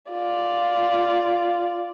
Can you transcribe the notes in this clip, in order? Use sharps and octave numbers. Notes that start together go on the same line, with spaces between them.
F4 D5